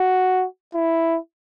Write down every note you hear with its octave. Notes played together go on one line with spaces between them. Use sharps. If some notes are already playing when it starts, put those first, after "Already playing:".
Already playing: F#4
E4